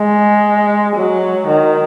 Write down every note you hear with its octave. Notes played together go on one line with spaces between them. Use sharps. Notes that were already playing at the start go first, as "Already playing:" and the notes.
Already playing: G#3
F#3
D#3